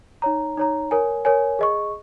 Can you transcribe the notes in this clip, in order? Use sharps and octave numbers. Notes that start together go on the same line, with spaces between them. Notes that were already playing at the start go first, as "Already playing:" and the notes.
D#4 C#5 A#5
D#4 C#5 A#5
A#4 C#5 G#5
A#4 C#5 G#5
G#4 D#5 C#6